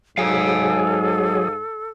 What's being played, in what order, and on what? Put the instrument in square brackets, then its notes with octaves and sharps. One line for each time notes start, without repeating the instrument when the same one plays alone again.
[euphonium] G#2 [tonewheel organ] F#3 G#4 [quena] A4 [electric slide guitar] F5 G#5